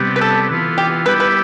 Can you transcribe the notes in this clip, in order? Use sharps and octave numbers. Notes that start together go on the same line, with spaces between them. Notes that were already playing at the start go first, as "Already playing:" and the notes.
Already playing: C3 G3 B3
B4
A4
E3 B3 F4
G4
G3 B3 E4 G4 B4
B4